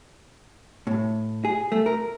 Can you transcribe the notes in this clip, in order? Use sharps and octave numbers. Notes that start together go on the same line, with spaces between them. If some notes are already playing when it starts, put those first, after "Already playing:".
A2
G#4
A3
A#4